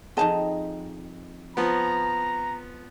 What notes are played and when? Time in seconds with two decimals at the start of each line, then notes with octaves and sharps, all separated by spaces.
0.17 F2 D#4 G#4 D#5 A5
1.57 F3 B3 A#5